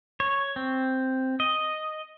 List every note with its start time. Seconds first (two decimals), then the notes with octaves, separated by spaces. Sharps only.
0.20 C#5
0.56 C4
1.40 D#5